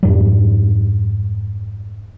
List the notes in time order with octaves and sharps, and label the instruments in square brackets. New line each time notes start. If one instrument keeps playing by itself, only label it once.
[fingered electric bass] F2 G#2 G3